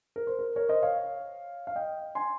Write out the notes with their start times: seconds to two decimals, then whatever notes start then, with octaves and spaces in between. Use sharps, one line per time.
0.16 A#4
0.27 C5
0.39 A#4
0.56 A#4 C#5
0.69 C5 D#5
0.83 C#5 F5
1.67 F5
1.75 D#5 G5
2.15 G#5 C6